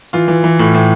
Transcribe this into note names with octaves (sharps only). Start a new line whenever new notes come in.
E3 F4
E3
E3
A2
A2